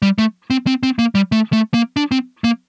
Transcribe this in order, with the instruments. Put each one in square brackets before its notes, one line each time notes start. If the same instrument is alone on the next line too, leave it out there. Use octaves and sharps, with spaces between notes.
[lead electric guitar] G3
A3
C4
C4
C4
A#3
G3
A3
A3
A#3
D4
C4
A#3